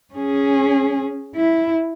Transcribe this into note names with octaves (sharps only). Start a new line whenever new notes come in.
C#4 G#4
E4